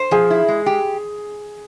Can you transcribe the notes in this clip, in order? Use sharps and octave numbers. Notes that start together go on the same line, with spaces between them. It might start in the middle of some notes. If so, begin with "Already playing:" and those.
Already playing: C5
F3 G#4
E4
G#3
G4